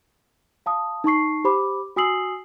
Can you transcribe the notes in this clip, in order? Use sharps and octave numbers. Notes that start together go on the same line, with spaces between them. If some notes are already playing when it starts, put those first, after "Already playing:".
F5 A5 D#6
D#4 A5 C#6 C7
G4 C5 B5 D6
F#4 G#5 D#6 E6 C7 F#7